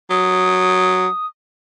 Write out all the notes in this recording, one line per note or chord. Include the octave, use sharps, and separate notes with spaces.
F#3 D#6